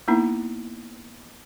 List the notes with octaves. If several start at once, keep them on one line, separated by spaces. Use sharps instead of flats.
A#3 B3 D#4 E4